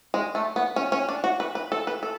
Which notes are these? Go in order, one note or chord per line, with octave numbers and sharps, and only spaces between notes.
G#3
A3
B3
C#4
C#4
D4
F#4
B4
B4
A4
B4
A4